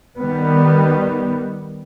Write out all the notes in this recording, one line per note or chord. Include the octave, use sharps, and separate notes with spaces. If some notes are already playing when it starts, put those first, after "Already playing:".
D#3 G3 B3